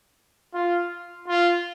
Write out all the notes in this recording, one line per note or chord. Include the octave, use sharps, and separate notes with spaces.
F4
F4